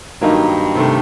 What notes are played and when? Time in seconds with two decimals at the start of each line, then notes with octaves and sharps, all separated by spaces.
0.21 G2 D#3 F#3 A#3 D#4
0.75 C3 D#3 A3